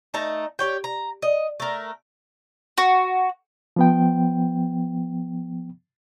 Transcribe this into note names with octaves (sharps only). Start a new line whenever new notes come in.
A3 D#4 A5 A#5
G4 C#5 G5
A#5
D#5
A3 A#4
F#4
F3 B3 G5